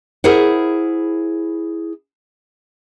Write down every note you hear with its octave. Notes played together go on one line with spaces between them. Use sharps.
E4 G#4 A#4 C5 F#5